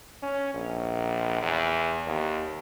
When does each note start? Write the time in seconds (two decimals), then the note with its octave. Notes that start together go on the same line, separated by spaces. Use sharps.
0.23 C#4
0.54 A#1
1.42 E2
2.07 D#2